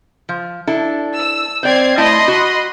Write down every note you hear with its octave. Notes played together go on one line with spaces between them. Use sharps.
F3
D4 E4 A4
E6
C4 C5 D5 G#6 C7
A3 E4 D#5 A5 B5 C6
F#4